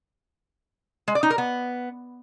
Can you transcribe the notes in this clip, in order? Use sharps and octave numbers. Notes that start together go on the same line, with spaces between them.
G#3
D5
D#4
A#4
B3